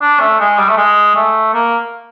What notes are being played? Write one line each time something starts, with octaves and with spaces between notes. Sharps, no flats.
D4
A3
G#3
G3
A3
G#3
A3
A#3